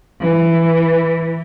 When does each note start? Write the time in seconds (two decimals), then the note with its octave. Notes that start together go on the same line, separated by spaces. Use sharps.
0.21 E3